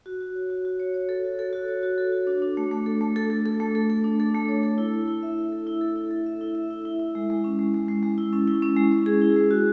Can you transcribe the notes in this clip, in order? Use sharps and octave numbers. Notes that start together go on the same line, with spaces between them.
F#4
F#4
C#5
F#4
F#4
C#5
C#5
A4
F#4
A4
F#4
C#5
F#4
A4
F#4
D4
D4
A3
A3
A4
A3
A4
A4
A4
A3
A4
A4
D4
A4
A3
C#5
A4
E4
E4
E4
E5
A4
A4
E4
A4
E4
A4
E5
E4
E5
E4
E4
E4
G#3
G#3
C#4
G#3
G#3
G#3
G#3
E4
C#4
E4
C#4
G#3
C#4
G#4
E4
G#3
F#4